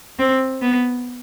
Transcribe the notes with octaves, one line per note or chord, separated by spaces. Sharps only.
C4
B3